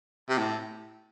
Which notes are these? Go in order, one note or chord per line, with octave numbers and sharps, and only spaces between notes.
C3
A2